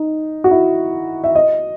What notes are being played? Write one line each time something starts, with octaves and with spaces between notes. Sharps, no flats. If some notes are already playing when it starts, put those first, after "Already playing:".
Already playing: D#4
F#4
E4
E5
D#5